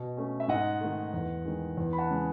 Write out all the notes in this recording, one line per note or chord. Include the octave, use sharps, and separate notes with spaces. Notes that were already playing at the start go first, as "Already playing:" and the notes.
Already playing: B2
A3 C#4
E5
G#2 D#5 F#5
D#3 A3
E2
D#3 G#3
E2
B5
F#5 A5
C#3 G#3